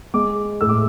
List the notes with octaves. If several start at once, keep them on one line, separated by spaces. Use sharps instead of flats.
G#3 D6
A2 E6
D6